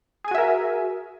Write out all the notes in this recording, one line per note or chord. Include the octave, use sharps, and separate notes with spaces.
F#4 G#4 A#4 E5 G#5